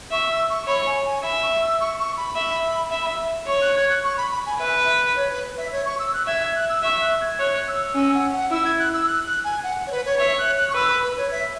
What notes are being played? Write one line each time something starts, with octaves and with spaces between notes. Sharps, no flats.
E5 C#6
E6
C#6
C#5 B5
G#5
G#5
E5 B5
C#6
E6
C#6
C#6
B5
E5
E5
C#5 C#6
F#6
G#6
F#6
C#6
B5
B5
G#5
B4 E5
C#5
B4
E5
C#5
C#6
E6
F#6
E5 G#6
G#6
F#6
E6
E5 C#6
F#6
G#6
C#5 F#6
F#6
E6
C#4 E6
F#5
F#5
E4 E6
G#6
F#6
E6
F#6
F#6
G#5
F#5
C#5
B4
C#5
C#5 E5
F#6
F#6
C#6
B4 E6
B5
B4
C#5
E5